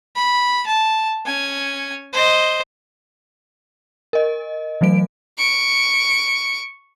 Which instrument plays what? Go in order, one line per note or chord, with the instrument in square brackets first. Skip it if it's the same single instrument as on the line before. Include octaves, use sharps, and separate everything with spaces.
[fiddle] B5
A5
C#4 G#5
C5 D#5
[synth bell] A#4 D#5
E3 F#3 A3 D7
[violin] C#6 D7